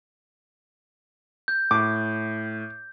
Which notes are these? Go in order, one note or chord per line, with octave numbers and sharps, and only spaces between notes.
G6
A2 D6